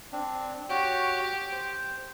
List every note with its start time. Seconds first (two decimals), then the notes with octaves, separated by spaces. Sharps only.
0.13 C4 D4
0.70 F#4 G4 C#5
1.52 C5